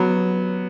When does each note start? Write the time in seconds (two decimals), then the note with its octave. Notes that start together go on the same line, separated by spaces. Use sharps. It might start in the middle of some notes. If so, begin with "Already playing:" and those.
Already playing: F#3 B3